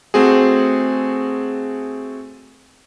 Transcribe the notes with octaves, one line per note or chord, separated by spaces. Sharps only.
A3 C4 F#4 G#4